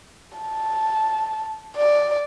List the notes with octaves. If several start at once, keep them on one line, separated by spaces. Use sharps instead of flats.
A5
D5